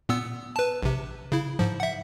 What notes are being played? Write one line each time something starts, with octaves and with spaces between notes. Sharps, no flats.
A#2 B3 E6
B4 A5
A#1 C3
C#3 E4
G#2 F3
E5 F#5